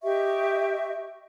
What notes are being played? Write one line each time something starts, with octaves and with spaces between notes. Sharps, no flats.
G4 D#5 E5 C#6